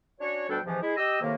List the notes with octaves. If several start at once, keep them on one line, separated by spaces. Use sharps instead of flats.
C#4 D4 F#4 C#5
D2 B2 G3 D4 A4 G5
G#2 C3 E3 F3
G#3 E4 G#4
G4 D#5 E6
A2 C3 D#3 A#3